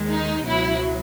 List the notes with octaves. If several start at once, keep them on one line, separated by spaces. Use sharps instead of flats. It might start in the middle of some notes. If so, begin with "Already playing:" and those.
Already playing: D#2 D#3 G#3
D#4
C#2 B2 F#3 E4